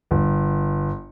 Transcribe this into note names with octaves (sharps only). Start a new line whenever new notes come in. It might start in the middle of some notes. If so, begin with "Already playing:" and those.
G1